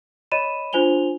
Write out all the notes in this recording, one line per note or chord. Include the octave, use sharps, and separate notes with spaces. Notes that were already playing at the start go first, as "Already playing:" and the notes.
C#5 D#5 B5 D#7 E7
D4 F4 C5 G#5 F7 G7